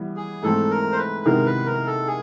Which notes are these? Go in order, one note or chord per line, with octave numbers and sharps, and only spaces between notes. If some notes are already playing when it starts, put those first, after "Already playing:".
Already playing: E3 G3 B3
G#4
G#2 E3 A3 C4 A4
A#4
C5
B4
C3 D#3 G#3 B3 A#4
B4
A#4
A4
G#4